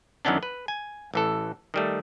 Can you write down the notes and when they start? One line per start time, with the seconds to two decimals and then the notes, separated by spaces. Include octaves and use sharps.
0.25 F#2 D#3 E3 B3 C#4 D4
0.43 B4
0.68 G#5
1.14 A1 E3 A4
1.74 D#3 G3 A3